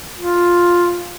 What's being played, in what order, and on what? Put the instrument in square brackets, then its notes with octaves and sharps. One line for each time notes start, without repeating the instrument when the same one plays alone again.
[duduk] F4